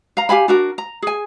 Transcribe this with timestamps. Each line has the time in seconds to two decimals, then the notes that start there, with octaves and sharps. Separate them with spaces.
0.17 F5 A#5
0.29 G4 F5 G#5 B5
0.48 D4 F#4 A#4
0.78 A#5
1.02 G#4 G#5